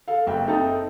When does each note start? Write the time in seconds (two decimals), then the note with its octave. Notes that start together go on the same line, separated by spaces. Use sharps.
0.08 A4 F5
0.27 F#1 E5 G5
0.47 C4 D#4 A4 G5 A5